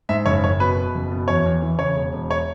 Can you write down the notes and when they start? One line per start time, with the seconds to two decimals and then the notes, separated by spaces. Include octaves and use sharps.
0.09 G#2 E5
0.26 F#1 C#5
0.43 F#1 C#5
0.60 B2 B4
0.77 B2
0.95 F#1
1.11 B2
1.28 E2 C#5
1.45 E2
1.62 E3
1.79 C#3 C#5
1.96 E1
2.13 E1
2.31 C#5